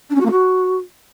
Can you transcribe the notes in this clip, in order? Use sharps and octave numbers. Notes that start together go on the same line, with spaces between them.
D4
C#4
F#4
A#3
F#4